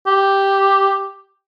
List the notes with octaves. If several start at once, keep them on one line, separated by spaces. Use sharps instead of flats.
G4